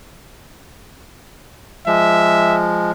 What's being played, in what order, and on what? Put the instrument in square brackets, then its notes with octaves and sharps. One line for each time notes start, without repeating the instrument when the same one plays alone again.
[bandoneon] F3 G#3 [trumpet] E5